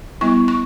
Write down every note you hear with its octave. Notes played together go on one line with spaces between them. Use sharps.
G3 B3 E4 C#6
C#6